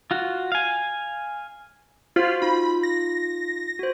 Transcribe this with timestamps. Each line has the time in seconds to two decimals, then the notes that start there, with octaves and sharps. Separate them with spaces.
0.11 F4 F#4
0.52 F5 G#5
2.16 F4 F#4 C5 F5
2.42 D#4 F4 B5
2.83 A#6
3.79 F#4 C5